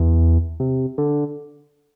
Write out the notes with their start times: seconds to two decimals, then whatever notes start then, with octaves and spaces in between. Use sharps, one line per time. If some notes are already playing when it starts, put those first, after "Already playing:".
Already playing: E2
0.60 C3
0.98 D3